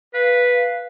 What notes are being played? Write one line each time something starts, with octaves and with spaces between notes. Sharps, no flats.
B4 F5